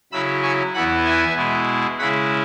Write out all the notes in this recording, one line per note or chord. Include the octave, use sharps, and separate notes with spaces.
C#3 F#3 E4 B5 E6
G#5 C#6
E2 E3 B3 E4 F#5 B5
E5 G#5
B2 G#3 E4
C#3 G#3 E4 F#5 B5